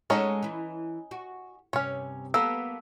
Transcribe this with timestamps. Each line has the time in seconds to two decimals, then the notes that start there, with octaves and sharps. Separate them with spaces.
0.10 G#3 C#4 D#4 F#4 A4 C#5
0.42 E3 E4
1.11 F#4
1.73 G2 C3 C#4 C#5
2.34 A#3 B3 A4 E6